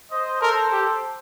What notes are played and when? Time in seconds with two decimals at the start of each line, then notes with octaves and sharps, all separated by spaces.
0.12 C5 D#5
0.42 A4 A#4 C5
0.72 G4